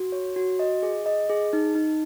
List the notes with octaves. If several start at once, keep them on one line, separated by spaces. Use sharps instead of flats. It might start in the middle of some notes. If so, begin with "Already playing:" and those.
Already playing: F#4
C#5
F#4
D#5
G#4
D#5
G#4
D#4
D#4